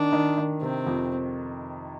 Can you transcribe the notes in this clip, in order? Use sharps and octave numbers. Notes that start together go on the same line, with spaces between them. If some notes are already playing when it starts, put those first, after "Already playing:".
Already playing: D#3 D4
D#3
D#3
C3 C4
F2